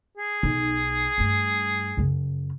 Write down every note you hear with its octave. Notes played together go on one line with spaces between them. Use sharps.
G#4
B1 D#4
G2 A3
F#2 C#3